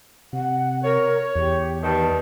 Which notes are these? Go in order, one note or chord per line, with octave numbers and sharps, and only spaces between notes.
C3 F#5
A#4 C#5
E2 G4
G2 D#3 A5